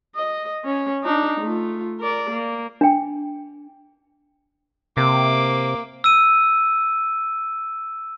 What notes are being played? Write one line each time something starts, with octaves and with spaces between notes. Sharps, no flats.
D#5
C#4
D4 D#4
A3 F4
A#4 D5
A#3
D4 G5
C3 A#3 D6
E6 D#7